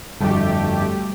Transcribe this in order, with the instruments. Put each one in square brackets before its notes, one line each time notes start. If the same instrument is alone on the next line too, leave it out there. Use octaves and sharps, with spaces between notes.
[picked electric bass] G1 F2 [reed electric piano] G3 F#4 [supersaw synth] A3 G4